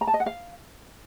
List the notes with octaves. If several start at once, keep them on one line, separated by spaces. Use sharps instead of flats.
A#5
A5
D#5
F#5
F5